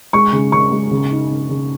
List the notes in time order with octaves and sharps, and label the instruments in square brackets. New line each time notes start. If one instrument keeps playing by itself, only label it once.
[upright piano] G#3 [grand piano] C#6
[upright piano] C#3
[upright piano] C#3 [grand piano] C#6
[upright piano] G#3
C#3
D#4
C#3
C#3